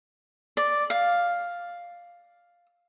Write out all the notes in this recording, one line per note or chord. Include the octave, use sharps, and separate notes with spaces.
D5
F5